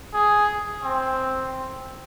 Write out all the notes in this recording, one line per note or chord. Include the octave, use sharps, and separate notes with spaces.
G#4
C4